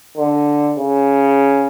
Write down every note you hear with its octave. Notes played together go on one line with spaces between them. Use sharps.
D3
C#3